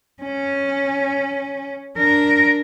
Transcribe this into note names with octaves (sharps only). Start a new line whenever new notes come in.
C#4
D4 A#4